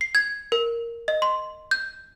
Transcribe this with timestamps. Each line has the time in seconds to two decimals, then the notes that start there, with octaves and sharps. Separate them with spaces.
0.01 C7
0.15 G#6
0.52 A#4
1.08 D#5
1.22 C6
1.71 G6